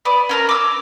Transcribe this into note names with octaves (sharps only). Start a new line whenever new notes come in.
B3 D5
C#4 A#4 A5
D6 E6